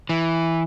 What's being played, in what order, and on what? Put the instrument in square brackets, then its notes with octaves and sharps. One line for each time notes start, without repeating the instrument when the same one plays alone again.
[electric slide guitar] E3